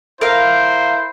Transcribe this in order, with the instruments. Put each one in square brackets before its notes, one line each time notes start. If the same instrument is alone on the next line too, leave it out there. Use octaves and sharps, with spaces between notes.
[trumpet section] E4 C5 [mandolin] A#4 F5